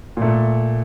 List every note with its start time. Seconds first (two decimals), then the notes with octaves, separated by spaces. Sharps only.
0.17 A#2 A3